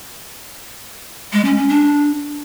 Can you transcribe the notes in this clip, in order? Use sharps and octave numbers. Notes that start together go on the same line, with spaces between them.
G#3
C#4
C#4
D4